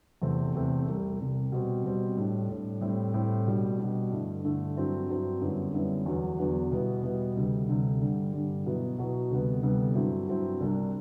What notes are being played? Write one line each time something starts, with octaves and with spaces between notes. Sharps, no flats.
E2 C3 E3 A3 C4
E2 C3 E3 A3 C4
C2 C3 G3
C2 C3 G3
B2 G3 C4
B2 G3 C4
A2 G3 D4
A2 G3 D4
A2 G3 C4 E4
A2 G3 C4 E4
B2 G3 D4
B2 G3 D4
G2 D3 A3 E4
G2 D3 A3 E4
G2 F#3 C4 E4
G2 F#3 C4 E4
F#2 D3 G3 B3 E4
F#2 D3 G3 B3 E4
E2 D3 F#3 B3
E2 D3 F#3 B3
B2 G3 B3 E4
B2 G3 B3 E4
D2 C3 G3
D2 C3 G3
G2 D3 G3
G2 D3 G3
B2 F#3 B3 E4
B2 F#3 B3 E4
D2 C3 G3 B3
D2 C3 G3 B3
G2 F#3 C4 E4
G2 F#3 C4 E4
C2 C3 G3 D4